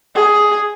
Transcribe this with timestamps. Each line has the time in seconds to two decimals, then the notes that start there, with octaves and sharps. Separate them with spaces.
0.15 G#4